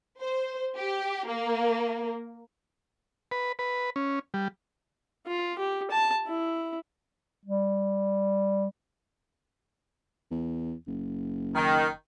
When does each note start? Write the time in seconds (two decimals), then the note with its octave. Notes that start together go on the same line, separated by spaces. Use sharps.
0.20 C5
0.76 G4
1.27 A#3
3.31 B4
3.59 B4
3.96 C#4
4.34 G3
5.27 F4
5.59 G4
5.91 A5
6.27 E4
7.45 G3
10.31 E2
10.87 F#1
11.54 D#3